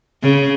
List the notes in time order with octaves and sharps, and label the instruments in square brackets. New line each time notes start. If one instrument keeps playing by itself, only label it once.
[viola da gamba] C#3